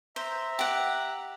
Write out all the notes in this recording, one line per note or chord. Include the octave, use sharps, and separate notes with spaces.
C5 E5 A#5
G4 F#5